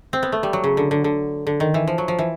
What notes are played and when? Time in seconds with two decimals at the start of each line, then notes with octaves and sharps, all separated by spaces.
0.13 C4
0.23 B3
0.32 A3
0.43 G3
0.53 F#3
0.64 C#3
0.77 D3
0.91 D3
1.04 D3
1.47 D3
1.60 D#3
1.74 E3
1.87 F3
1.98 F#3
2.08 F3
2.19 E3